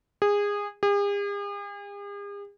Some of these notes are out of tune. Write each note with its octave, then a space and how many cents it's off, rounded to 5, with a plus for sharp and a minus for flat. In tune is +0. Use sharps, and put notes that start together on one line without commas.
G#4 -20
G#4 -45